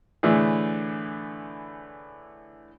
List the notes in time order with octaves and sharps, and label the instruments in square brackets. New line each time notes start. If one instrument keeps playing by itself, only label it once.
[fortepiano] A2 D3 E3 A3 D4 G#4